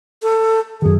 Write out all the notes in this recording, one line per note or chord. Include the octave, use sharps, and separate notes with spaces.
A4
F#2 D#3 G#4